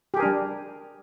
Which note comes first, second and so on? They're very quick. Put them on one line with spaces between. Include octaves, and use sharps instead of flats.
G4 G#4 A#4 D4 G3